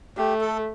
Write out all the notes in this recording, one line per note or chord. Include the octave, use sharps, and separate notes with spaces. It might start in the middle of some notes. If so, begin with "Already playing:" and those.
A3 G4
A4